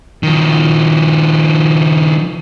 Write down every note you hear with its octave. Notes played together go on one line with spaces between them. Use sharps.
D#3 F3